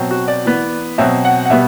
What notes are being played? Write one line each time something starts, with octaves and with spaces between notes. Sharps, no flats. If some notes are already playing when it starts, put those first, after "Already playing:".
Already playing: B2 F#3 C4
F#4
D5
E3 B3
B2 F#3 C4 E5
F#5
F#5
B2 G3 B3 E5